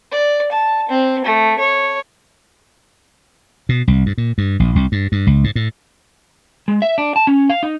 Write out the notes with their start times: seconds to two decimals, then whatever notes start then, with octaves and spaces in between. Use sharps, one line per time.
0.12 D5
0.52 A5
0.89 C4
1.25 A3
1.59 C#5
3.69 B2
3.88 C2
4.06 G2
4.18 A#2
4.38 G2
4.60 A#1
4.75 C2
4.92 G2
5.12 G2
5.27 C#2
5.44 G#2
5.56 A2
6.68 G#3
6.82 E5
6.98 D4
7.16 A5
7.27 C#4
7.50 F5
7.63 D#4